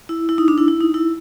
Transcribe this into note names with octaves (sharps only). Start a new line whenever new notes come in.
E4
E4
D#4
D4
E4
E4
D#4
E4